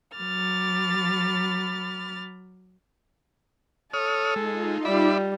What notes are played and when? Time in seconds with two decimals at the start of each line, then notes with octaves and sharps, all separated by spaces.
0.16 F#3 B5 D6 F6 A6
3.93 A4 C#5 D#6 F6
4.36 G#3 D#4 F4
4.85 G3 D5 E5 B5